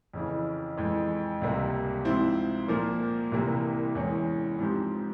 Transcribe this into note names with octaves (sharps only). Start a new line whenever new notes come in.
F2 C#3 E3
F2 E3 G#3
C#2 C3 G3 A#3
G#2 F3 C4 E4
A#2 F3 A#3
C2 C3 E3 A#3
E2 E3 G#3 C#4
G#2 F3 C4 G4